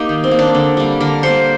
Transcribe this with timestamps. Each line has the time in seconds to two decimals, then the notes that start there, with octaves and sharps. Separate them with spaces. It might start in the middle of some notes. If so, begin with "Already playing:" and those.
Already playing: A#3 D#4 G4 A#4
0.09 D#3
0.24 C4
0.31 A#3
0.39 D4
0.55 D3
0.77 G3 A#3
1.00 D3 A#4
1.23 G3 A#3 C5